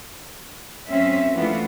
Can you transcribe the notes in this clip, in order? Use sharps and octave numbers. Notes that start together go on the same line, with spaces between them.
F#2 C4 C#4 E5
E3 A3 B3 D4 E4 F4